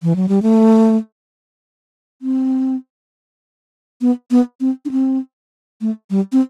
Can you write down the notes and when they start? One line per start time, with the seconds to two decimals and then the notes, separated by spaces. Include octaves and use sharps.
0.03 E3
0.16 F#3
0.29 G3
0.42 A3
2.22 C4
4.01 B3
4.31 B3
4.61 C4
4.85 D4
4.91 C4
5.81 A3
6.10 G3
6.32 C4